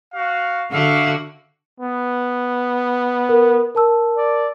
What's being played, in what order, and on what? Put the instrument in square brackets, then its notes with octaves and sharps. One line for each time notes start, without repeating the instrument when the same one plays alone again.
[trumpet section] F#4 F5
[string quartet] D3 F#4 [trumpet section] E5 F5
[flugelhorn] B3
[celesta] A#4
A#4 A5 E6
[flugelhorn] D5